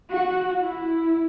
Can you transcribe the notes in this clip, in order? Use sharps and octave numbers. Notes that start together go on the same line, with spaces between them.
F#4
E4